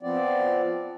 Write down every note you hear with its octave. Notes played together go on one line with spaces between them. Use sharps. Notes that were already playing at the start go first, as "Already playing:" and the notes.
F3 B3 C4 D5